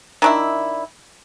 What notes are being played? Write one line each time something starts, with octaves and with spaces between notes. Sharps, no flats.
D#3 D4 E4